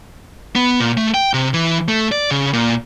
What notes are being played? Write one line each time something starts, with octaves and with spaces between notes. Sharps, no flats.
B3
A#2
A3
G5
C3
E3
A3
D5
C#3
A#2